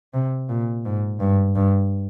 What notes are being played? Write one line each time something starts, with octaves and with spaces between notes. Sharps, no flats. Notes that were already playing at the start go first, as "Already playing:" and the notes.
C3
A#2
G#2
G2
G2